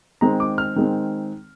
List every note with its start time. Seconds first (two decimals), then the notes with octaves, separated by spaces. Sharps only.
0.21 D#3 G#3 C4 A#5
0.40 D6
0.58 F6
0.76 D#3 G#3 C4